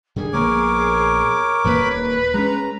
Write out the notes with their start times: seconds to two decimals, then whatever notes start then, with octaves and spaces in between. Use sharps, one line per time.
0.16 D3 D#3 G3 G#4
0.33 A#1 A#3 B3 A#4 C#5 D6
1.64 D#1 D#2 A#3 B4
2.34 G#3 C4 C#4 A#5